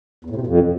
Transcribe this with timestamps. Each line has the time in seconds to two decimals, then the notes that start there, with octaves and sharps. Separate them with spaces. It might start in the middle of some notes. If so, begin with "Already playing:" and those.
0.25 E2
0.30 A2
0.36 C3
0.41 B2
0.47 F2